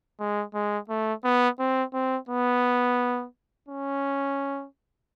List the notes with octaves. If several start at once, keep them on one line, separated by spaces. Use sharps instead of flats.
G#3
G#3
A3
B3
C4
C4
B3
C#4